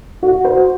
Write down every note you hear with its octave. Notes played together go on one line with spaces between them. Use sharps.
F#4
C5